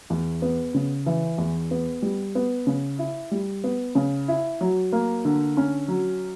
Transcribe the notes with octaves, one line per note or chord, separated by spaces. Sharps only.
E2
B3
C#3
E3
E2
B3
G3
B3
C#3
E4
G3
B3
C#3
E4
F#3
A#3
D3
C#4
F#3